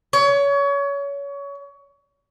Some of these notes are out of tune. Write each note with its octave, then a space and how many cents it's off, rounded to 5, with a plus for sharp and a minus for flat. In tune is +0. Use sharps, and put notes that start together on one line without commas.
C#5 +25